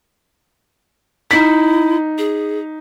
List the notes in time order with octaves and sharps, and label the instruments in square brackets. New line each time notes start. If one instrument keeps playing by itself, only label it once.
[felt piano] D#4 B6 [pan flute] E4
[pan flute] G#4